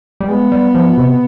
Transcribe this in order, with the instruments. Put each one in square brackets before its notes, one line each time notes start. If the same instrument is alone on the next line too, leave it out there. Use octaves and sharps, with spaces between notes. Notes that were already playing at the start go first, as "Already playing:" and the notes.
[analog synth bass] G3
[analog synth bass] G#3 [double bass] B3
[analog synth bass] G3
F3
C3